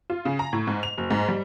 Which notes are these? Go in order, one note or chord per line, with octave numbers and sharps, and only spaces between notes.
F4
C#3
A#5
A2
G#2
F7
F#1
G#2
G3